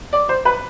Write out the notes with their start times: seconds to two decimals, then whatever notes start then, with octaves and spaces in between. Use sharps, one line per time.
0.13 D5
0.29 C5
0.45 B4